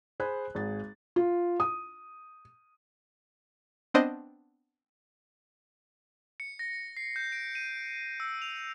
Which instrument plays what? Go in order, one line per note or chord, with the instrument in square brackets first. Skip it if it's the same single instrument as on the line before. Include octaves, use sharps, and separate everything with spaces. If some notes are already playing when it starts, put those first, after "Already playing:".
[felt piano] G#4 C5 G#5 B5 F#6
G#1 G#4 A6
F4
D#6
[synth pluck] B3 C4 D4 C5 D#5
[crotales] C#7
A#6
C7
G6
D7
D#7
E6
F7